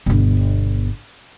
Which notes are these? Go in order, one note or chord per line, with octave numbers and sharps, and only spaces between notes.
G1 B2